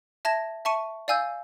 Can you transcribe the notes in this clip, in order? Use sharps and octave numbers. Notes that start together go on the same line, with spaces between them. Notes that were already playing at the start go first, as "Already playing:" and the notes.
E5 A5 G#6 A#6 E7
E5 A5 C#6 C#7 D#7
D5 F5 G#5 E6 G6